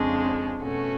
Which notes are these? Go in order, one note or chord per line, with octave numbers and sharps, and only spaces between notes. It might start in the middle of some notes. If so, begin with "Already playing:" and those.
Already playing: F2 C#3 G#3 D4
B2 A3 C#4 F#4